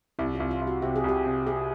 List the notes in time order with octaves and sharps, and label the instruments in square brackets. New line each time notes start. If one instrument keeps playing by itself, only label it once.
[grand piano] C2 [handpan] E4
[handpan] F4
[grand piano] C2
[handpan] F4
[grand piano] C2
[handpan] F#4
[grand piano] C3 [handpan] G4
[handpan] G#4
[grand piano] C2 [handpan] G4
[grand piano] C3
[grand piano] C3 [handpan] G#4